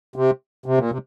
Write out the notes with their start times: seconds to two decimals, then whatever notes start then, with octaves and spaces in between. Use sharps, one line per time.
0.16 C3
0.66 C3
0.78 A#2
0.91 C3